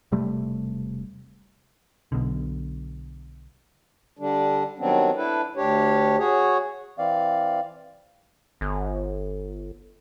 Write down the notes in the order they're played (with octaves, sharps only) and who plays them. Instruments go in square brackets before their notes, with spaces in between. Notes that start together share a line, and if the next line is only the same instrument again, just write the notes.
[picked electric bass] E1 C3 G3 A3
B1 B2 D3
[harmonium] D3 G3 D4
D#3 F#3 G3 B3 C4 D4
D4 E4 A4 B4
D2 D4 G4 C#5
F#4 G#4 C#5
[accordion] E3 C4 D5 F5
[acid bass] G1